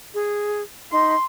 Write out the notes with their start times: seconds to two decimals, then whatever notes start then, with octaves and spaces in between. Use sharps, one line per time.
0.14 G#4
0.92 D#4 C6